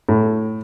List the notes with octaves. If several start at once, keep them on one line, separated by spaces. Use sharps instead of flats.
A2